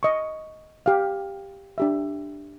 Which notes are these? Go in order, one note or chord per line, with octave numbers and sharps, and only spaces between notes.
D#5 C#6
G4 F5
D4 G4 E5